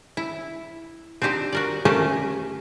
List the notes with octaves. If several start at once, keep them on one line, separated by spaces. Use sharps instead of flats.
E4
C4 D4 D#4 G4 C5
F#4 A#4 D5
A3 A#3 C#4 G4 A4 A#4